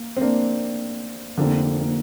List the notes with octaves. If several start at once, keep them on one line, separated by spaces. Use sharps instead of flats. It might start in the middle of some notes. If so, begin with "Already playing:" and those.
Already playing: A#3
C4
A#3 D4
F1 F2 D3 A#3
A#3